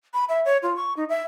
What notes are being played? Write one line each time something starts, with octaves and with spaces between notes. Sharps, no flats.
B5
E5
C#5
F4
C#6
D#4
E5